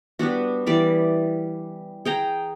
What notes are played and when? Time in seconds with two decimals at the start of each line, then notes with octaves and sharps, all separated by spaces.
0.19 G3 B3 D4 F#4
0.66 E3 G3 D5
2.05 G#4 G5 A#5